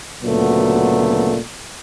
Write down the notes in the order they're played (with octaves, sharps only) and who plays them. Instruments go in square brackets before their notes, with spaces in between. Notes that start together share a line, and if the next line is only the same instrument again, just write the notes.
[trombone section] D2 A#2 C#3 F#3 A3 B3